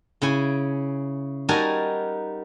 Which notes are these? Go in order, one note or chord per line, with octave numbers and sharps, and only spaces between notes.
C#3 E4 G#5
G3 D#4 F#4 A#4 G#5 A5